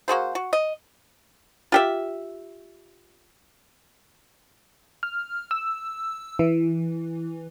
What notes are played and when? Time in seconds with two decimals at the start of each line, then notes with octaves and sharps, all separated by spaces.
0.08 A#3 F#4 G#4 C5
0.35 F#4
0.53 D#5
1.72 F4 G4 E5
5.03 F6
5.51 E6
6.39 E3